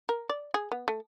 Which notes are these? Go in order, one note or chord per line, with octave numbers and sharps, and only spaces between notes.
A#4
D5
G#4
B3
A3